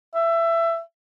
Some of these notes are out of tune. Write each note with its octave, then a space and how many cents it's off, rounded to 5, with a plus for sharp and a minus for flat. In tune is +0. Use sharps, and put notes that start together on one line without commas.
E5 +20